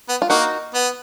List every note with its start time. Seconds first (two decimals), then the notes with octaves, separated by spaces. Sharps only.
0.09 B3
0.22 F4
0.30 A#3 D#4 F#4
0.75 B3